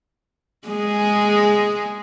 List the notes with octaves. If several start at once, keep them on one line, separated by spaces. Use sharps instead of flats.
G#3 G#4